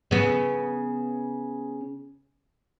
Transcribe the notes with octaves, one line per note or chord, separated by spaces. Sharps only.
C#3 B3